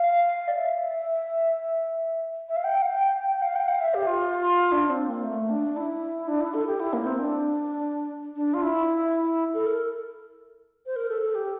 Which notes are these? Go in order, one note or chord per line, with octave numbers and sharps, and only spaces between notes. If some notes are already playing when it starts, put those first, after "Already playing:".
Already playing: F5
D5
E5
E5
F5
G5
F5
G5
G5
G5
F5
G5
F5
E5
G4
F4
D4
C4
A#3
A3
D4
E4
D4
E4
A4
G4
E4
A#3
C4
D4
D4
F4
E4
A4
A#4
C5
A#4
A4
A4
G4